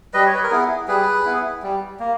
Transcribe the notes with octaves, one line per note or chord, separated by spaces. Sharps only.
G3 B4 D#5
C#5
B4
A#4
B3 E4 G#4
G3 G#4 B4
B3 E4
G3
A#3